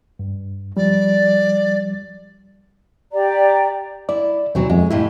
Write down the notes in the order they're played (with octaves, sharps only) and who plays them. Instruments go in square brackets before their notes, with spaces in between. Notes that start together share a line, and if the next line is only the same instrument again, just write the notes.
[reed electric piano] G2
[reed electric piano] F3 G3 [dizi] D5
[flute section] G4 D5 A#5
[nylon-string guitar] E4 [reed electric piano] D5
[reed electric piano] D#2 B2 [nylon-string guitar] E3 F#3 C4
[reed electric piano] F2 [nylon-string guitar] G#3
[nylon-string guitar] F2 A2 C3 [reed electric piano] E4